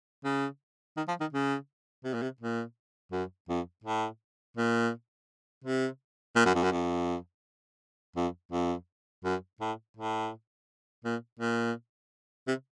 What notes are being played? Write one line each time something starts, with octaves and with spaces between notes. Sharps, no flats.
C#3
D#3
F3
D#3
C#3
C3
A#2
C3
A#2
F#2
F2
A2
A#2
C3
A#2
F#2
F2
F#2
F2
F2
F2
F#2
A2
A2
A#2
A#2
C3